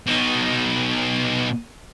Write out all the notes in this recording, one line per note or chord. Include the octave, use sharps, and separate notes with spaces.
B2 D#4